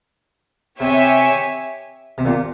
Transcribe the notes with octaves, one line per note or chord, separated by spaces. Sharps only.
C3 G4 C#5 E5 G#5
C3
A#2